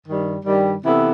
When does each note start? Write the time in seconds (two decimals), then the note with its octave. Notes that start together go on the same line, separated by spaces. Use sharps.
0.07 G2 D#3 G3
0.45 G2 D#3 G3
0.84 C3 E3 B3 E4 A4